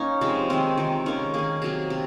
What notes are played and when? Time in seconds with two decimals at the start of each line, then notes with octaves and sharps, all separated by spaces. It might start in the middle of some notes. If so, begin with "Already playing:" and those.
Already playing: A#3 C#4 D#4
0.21 C3 F3 G#3
0.50 D#3 G#3 C4
0.78 D#3 G#3
1.06 D#3 A#3 C#4
1.34 D#3 A#3 G#4
1.62 C3 F#3 A#3 G#4
1.90 C3